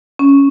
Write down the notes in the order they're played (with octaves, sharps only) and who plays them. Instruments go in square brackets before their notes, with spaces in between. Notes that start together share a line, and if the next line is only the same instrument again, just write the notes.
[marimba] C#4